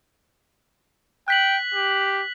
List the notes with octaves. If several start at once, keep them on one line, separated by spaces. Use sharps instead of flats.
G5 F#6 B6 F#7
G4